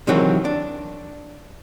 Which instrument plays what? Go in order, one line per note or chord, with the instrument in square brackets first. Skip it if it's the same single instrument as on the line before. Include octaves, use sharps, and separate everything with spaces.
[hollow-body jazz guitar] C3 D#3 E3 F#3 C4 G#4
D4